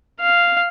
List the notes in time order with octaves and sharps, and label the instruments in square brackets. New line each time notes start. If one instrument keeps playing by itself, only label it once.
[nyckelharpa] F5